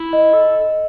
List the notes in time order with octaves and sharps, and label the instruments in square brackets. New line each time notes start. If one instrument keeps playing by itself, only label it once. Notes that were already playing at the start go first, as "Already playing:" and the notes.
Already playing: [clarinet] E4
[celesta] D#5
[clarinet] A4